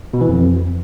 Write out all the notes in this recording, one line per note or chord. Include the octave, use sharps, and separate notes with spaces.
B2
E3
F2